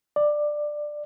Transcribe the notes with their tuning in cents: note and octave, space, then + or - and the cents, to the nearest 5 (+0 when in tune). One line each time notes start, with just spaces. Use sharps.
D5 +15